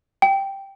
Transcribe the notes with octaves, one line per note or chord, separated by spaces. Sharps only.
G5